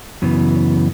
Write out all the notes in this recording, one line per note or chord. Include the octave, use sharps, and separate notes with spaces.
F#2 C#3 E3 B3